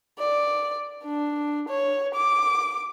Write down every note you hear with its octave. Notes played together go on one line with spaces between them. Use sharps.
D5
D4
C#5
D6